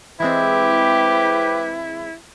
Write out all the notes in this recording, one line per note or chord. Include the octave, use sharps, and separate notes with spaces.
E3 G#3 C4 E4 G4 B4